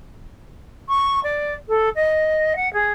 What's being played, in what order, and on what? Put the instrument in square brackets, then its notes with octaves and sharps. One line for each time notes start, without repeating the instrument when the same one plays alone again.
[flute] C#6
D5
A4
D#5
F#5
G#4